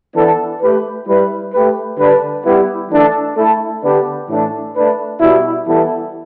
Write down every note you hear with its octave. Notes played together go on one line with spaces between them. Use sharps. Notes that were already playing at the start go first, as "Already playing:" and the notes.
E3 B3 D4 A4
A3 G4 B4
G3 E4 B4
A3 G4 B4
D3 G3 D4 B4
G3 B3 E4 G4 B4
E3 A3 D4 A4
A3 E4 A4
D3 B3 D4 G4 B4
A2 E3 A3 D4
A3 D4 B4
B2 G3 E4
E3 G3 B3 E4 A4